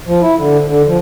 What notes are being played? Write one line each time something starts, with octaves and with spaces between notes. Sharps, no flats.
F3
E4
D3
D3
F3